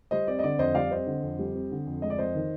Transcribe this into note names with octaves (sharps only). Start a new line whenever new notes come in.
G3 C5 D#5
C4 D5
D#5
D3 D5
F2 C5 D#5
G3 D5 F5
C4 C5 D#5
D3
F2
G3
C4
D3
F2
G#3 D#5
D5
F2 C5 D#5
D#3